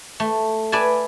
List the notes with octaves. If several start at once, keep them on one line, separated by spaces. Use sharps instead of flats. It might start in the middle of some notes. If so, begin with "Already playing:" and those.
A3
B4 D5 E5 G#5 A5